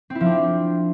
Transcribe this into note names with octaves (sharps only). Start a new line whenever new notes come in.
C4
E4
F3
D4
C4